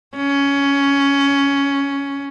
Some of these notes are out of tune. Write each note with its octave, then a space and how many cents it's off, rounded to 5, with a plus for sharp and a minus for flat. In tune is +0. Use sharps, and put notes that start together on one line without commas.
C#4 +10